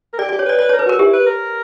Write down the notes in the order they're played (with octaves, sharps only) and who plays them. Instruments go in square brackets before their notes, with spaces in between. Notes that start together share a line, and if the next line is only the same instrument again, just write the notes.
[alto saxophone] A#4
[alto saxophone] G4 [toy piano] D5
[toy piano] D5
[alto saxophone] G4
[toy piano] C#5
[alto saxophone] B4 [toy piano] D5
[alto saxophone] B4 [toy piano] D5
[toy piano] C#5
[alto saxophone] A#4
[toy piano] B4
[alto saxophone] F#4 [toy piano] A#4
[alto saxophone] E4 [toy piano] G4
[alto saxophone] B4
A#4